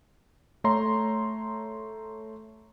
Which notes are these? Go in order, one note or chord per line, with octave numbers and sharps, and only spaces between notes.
A3 C#5 A#5 C6